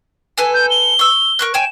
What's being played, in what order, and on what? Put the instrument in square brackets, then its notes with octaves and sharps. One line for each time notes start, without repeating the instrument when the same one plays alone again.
[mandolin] A4 B4 G#5
[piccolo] G6
G7
[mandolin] C#6 E6
A#4 C#6 F#6
[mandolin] C#5 G5 G#5 [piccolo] E7